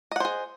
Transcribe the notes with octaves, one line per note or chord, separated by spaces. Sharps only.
G#4 C5 D#5 F#5